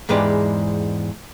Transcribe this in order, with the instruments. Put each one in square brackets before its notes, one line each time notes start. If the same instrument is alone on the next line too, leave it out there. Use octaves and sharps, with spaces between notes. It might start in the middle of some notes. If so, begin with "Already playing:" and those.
[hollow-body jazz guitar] E2 G#2 G#3 G4 B4 D5